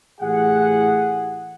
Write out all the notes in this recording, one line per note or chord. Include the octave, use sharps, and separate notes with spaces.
A2 E3 G4 G#4 F#5